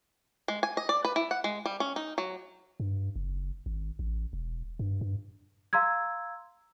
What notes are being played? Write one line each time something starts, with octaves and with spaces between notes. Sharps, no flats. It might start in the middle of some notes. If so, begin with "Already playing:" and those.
G#3
G#5
D#5
D5
B4
E4
F#5
G#3
G3
C#4
D#4
F#3
G2
F#1
G#1
A1
E1
G2
G2
F5 A#5 C6 E6 G#6